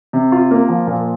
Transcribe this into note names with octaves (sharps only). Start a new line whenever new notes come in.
C3
F4
A#3
F3
A#2